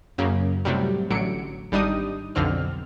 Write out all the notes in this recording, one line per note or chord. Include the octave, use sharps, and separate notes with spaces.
F#2 C#3 A#3
A2 C3 F#3 G3
A1 D3 F#3 C#7 D7
G#1 G3 D4 D#4 D#6
B1 F2 D3 C4 F6